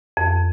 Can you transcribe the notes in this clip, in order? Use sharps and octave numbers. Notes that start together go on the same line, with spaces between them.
F2